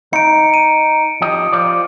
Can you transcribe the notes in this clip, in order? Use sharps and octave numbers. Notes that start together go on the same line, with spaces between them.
D#4 C#7 D7
D#7
F3 G4 D#5
F4 C5 D5